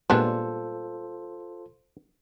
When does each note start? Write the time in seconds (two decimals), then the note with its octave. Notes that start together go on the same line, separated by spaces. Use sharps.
0.10 A#2 G3 G#3 B3 D4 F4 A4 C5